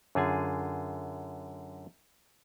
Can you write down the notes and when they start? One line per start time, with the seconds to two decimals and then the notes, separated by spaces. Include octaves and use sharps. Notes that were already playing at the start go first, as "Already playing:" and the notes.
0.15 F#2 D3 F4 G#4 G#5